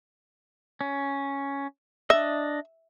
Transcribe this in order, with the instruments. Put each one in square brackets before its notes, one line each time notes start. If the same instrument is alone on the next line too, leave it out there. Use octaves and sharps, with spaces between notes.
[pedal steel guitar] C#4
[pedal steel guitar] D4 D#5 [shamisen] E5